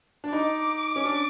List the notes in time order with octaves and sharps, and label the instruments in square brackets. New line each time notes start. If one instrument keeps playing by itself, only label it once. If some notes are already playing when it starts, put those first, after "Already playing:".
[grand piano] D4
[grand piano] D#4 [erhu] D6
[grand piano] C#4
D4